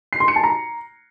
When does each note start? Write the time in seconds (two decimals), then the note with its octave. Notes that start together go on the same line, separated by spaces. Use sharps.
0.13 C7
0.20 C6
0.28 C#7
0.36 A5
0.44 A#5